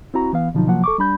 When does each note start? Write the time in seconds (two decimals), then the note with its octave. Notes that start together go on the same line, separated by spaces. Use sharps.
0.14 C4 E4 F#4 A#5
0.33 E3 B3 F5
0.54 B2 D3 F3 F#3 D#4
0.67 C3 F3 F#3 A#3 F#5
0.84 A4 C#6 D6
0.98 G3 D4 B5 G6